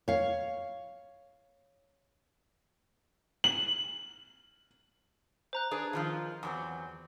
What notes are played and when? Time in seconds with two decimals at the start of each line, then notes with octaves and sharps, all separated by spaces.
0.08 C#5 F5
3.44 F#7
5.53 C5 A#5 F#6
5.71 D4 G#4 B4
5.93 D#3 F3 F4
6.43 E2 F#3 C4